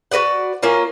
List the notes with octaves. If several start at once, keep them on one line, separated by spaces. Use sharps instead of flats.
F#4 B4 D5 F#5
A#3 C#4 F4